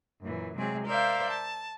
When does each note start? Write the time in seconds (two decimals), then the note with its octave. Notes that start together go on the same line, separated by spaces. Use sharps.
0.22 F#2 A#2 E3
0.56 C3 F#3 G#3 C4 G#4
0.86 A#4 C5 D5 E5 F5 G6
1.30 A5